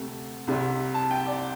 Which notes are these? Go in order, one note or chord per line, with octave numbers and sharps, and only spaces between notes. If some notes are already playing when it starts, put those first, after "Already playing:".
Already playing: D2 C3 A3
C2 C3 G3
A5
G5
D5